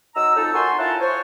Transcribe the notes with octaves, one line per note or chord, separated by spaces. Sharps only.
F#3 D#4 A#5 E6
F2 D#4 A4
F#4 A#4 G#5 A5 C6 C#6
E4 F4 C#5 F#5 A5 A#5
C5 C#5